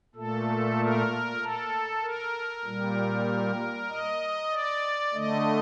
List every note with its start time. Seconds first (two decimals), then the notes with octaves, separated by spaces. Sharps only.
0.15 A#2 A3 A4
0.79 A#4
1.40 A4
2.02 A#4
2.65 A#2 G3
3.89 D#5
4.51 D5
5.14 D3 A3 D#5